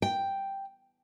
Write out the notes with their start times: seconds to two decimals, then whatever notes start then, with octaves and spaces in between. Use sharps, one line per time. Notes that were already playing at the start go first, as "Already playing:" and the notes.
0.02 G5